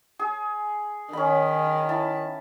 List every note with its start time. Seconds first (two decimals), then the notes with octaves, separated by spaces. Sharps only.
0.19 G#4
1.13 D#3 C#4 B5
1.89 E4 A5 B5